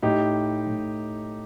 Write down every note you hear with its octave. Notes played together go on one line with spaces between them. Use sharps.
A2 D#4 G4
A2